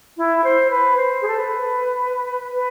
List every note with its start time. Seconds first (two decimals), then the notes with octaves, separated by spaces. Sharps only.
0.17 E4
0.43 C5
0.70 B4
0.96 C5
1.21 G#4
1.28 A4
1.35 B4
2.54 B4